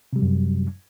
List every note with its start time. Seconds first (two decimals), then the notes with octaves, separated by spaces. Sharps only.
0.13 C3
0.16 G3
0.19 F#3
0.22 F#2